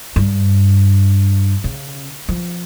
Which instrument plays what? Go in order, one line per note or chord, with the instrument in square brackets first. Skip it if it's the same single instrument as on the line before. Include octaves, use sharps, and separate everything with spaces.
[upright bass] G2
C#3
F3